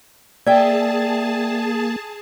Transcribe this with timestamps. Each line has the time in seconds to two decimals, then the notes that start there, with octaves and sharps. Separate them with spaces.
0.47 A#3 G#4 D5 E5 G5 A5